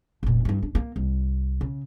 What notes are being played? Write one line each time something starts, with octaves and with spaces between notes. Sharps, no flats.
F1 A#2
G2 D#4
D4
A#3
C2
C#3